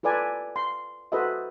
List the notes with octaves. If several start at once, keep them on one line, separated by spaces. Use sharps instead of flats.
F4 A4 B4 D5 G#5 A5
C6
F#4 A4 B4 C5 D#5 E5